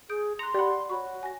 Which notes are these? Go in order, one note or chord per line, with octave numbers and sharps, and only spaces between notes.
G#4 D#6 G6 D7
A#5 C6 F#6 C#7
G4 D5 F#5 B5
F#4 C#5 B5 C#6
G#5 A#6